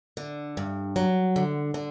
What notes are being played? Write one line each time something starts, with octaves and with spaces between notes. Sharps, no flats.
D3
G2
F#3
D3
D3